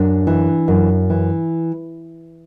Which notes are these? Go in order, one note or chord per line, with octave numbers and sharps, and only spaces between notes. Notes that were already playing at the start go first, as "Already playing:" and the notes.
Already playing: F#2 D4
E3
F#2
E3